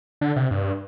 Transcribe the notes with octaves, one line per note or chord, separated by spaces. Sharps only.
D3
C3
G2